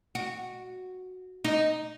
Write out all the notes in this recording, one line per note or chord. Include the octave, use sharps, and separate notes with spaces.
F#4
D#4